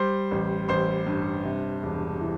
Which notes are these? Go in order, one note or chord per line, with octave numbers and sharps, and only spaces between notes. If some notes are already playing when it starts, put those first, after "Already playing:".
Already playing: G3 C5 C6
A1
A1 C5 C6
G2
C3
E1
E3